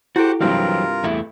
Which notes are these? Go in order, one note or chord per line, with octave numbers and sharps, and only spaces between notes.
E4 F#4 G4 A4 C5 F#5
G2 C3 E3 F#3 C4 F4 A#4
E2 A3 E4